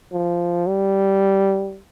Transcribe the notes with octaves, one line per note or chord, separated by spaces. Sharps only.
F3
G3